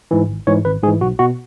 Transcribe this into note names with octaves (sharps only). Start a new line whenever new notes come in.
G#2 E3
G#1
G#2 E3 C#5
G#1 B4
G#2 E3 G#4
B1 F#4
B2 F#4